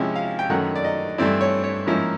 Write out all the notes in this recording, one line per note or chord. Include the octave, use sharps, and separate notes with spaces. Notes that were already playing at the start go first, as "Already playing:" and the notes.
Already playing: C3 F3 G#3 C#4 E4
F5
G5
F#2 D#3 F#3 A3 F#5
D5
D#5
G2 E3 A3 C4 E4 D5
C#5
C#5
G#2 F3 A#3 C#4 E4